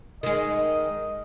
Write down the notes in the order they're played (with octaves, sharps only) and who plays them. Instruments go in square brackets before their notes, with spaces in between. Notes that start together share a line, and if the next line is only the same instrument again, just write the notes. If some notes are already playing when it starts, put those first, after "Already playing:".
[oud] D#3 G#3 [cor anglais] D#5